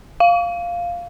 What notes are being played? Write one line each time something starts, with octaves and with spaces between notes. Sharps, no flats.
F5